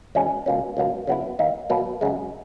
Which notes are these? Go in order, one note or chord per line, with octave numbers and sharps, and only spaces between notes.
E2 B2 G#3 C#4
C#2 B2 A#3 C#4
C#2 B2 F#3 A#3
C#3 F#3 B3 E4
D#2 D#3 A#3 D#4
B2 F#3 A#3
F#2 C#3 G#3